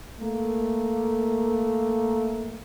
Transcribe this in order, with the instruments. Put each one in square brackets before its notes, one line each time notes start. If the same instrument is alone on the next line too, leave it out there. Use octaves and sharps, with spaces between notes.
[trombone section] A3 A#3